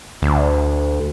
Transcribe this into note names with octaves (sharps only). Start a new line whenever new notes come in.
D2